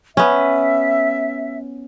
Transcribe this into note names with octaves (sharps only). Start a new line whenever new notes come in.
B3 C#4 E5